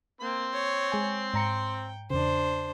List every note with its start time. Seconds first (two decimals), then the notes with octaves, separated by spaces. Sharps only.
0.21 A#3 C4 C6
0.53 C#5
0.90 G#3 G#5 G#6
1.34 G#2 G5 A#5 C#7
2.10 E2 C#3 D4 C5